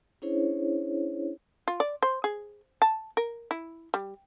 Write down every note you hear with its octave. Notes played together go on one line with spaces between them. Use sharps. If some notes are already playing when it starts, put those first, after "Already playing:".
C#4 D4 E4 G#4 C5 C#5
F4
D5
C5
G#4
A5
A#4
E4
G3